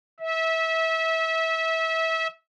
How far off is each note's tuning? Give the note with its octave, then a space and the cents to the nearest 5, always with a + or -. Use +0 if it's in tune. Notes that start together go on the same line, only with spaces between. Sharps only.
E5 -25